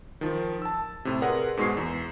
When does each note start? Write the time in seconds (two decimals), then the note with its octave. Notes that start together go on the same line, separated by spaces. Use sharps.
0.21 D#3 F3
0.62 A5 E6
1.05 A2 C3
1.22 G#4 A#4 B4 D5 F#5 C6
1.57 G#2 B2 G#3 G#4 C#6 C7
1.77 E2